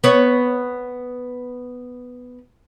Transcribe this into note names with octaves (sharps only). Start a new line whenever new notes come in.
B3 C#5